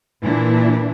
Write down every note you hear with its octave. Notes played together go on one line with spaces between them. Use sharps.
A#2 E3 D4 E4